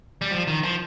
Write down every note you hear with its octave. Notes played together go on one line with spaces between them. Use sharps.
G3
F3
D#3
F3